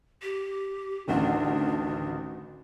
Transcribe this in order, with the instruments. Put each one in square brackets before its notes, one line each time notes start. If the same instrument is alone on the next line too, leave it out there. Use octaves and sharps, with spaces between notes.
[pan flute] G4
[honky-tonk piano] A1 D2 D#3 [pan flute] D4